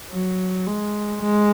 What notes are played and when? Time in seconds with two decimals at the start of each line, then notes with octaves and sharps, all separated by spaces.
0.11 F#3
0.67 G#3
1.21 G#3